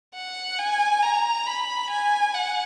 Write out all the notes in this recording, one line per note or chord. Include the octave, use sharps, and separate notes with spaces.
F#5
G#5
A#5
B5
G#5
F#5